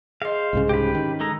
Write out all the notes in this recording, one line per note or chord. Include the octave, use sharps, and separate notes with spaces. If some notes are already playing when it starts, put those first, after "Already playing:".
G#4 C5 D#5 F5
C2 G#2 C#3
C#4 D#4 G4 B4
D#3
G#3 A4 A#5